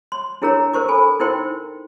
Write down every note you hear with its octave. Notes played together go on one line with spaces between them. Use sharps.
C6
D4 E4 G#4 A#4 C#5 A#5
A#4 C5 C#6 D6
A4 G#5 B5
D#4 E4 A#4 C5 G5 C6